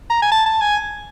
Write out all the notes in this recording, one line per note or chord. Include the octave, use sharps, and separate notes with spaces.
A#5
G#5
A5
A5
G#5